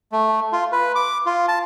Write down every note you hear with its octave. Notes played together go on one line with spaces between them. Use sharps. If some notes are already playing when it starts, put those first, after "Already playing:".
A3
F4
B4
D6
F4
A5